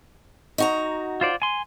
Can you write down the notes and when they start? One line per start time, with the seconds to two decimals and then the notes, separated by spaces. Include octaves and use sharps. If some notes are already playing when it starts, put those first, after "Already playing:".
0.58 D#4 F#4 A#5
1.21 F4 C5 D5
1.42 G#5 C6